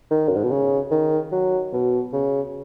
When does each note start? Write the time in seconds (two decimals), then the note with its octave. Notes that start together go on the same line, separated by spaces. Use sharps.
0.10 D#3
0.29 F#2
0.36 G#2
0.44 B2
0.51 C#3
0.91 D#3
1.32 F#3
1.73 B2
2.13 C#3